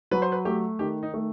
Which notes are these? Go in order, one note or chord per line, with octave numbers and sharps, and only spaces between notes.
F#3 B4
C5
B4
A3 G4
D#3 G4
D#4
A3